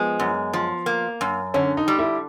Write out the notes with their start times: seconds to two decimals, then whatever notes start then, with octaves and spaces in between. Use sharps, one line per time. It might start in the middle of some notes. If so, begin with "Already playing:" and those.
Already playing: F3 G#3 B3
0.20 F#2
0.53 F3
0.86 A#3
1.21 F#2
1.54 D3 C#4
1.77 D#4
1.88 G3
1.99 E4